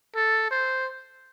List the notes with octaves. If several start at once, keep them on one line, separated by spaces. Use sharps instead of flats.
A4
C5